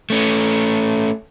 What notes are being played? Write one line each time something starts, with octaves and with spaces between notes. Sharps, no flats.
A3 C#4